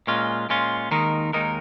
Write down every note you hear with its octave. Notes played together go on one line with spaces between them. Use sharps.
A#2 G#3 C#4 F4
A#2 G#3 C#4 F4
D#2 D#3 G#3 D#4 A#4
D#2 D#3 G#3 D#4 A#4